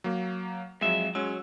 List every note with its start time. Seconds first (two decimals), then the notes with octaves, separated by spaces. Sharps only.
0.04 F#3 A#3
0.81 F2 F#3 G#3 E5
1.15 F#3 G#3 C#4 E6